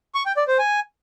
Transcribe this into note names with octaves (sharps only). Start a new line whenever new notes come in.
C#6
G5
D5
C5
G#5